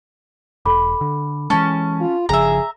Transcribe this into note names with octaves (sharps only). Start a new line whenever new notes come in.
E1 A4 B5 D6
D3
E3 G#3 C#4 A5
F4
G1 C#3 F3 G#4 E5 A#5